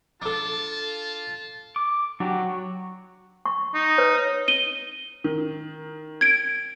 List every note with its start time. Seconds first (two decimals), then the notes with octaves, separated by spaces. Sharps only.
0.22 D4 F4 A4 A5
1.76 D6
2.20 F#3 D4 G4
2.39 F#4
3.46 C#6
3.74 D#4
3.98 B4 C#5
4.48 D#7 G7
5.24 D#3
6.21 G#6 D7